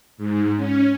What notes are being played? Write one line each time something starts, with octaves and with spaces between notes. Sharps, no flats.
G#2
C#4